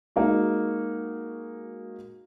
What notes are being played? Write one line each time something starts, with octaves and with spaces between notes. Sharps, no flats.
G#3 A#3 D#4 F#4